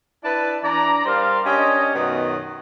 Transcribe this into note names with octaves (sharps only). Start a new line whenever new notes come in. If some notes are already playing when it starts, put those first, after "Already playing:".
D4 E4 B4 A5
E3 D4 D5 A#5
G3 A#4 C5 D5 F5
C#4 D4 G4 D#5
F#2 B2 D#3 B3 D#5 A#5